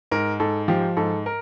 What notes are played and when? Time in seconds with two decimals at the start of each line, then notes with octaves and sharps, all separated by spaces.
0.11 G#2 A#4
0.40 G#2 A4
0.68 F3 G4
0.97 G#2 A4
1.26 A#4